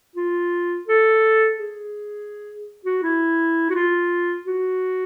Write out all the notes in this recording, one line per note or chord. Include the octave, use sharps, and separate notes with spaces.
F4
A4
G#4
F#4
E4
F#4
F4
F#4